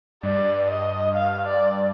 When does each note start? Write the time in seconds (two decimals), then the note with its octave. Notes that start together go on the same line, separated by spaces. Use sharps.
0.23 G2 D5
0.70 D#5
1.16 F5
1.47 D5